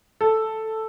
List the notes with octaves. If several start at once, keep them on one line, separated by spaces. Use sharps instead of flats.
A4